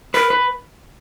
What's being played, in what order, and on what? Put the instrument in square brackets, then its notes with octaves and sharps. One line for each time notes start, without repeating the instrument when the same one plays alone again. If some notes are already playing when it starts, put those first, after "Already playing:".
[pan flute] A#4 [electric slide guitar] B4
[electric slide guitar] B4